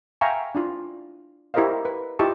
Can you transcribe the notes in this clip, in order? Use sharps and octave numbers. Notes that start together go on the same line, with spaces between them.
E5 F5 G5 G#5 A#5 C#6
D4 E4 F4
E4 G4 A#4 C5 D#5 F5
B4
E4 F4 G4 D#5 A5 C#6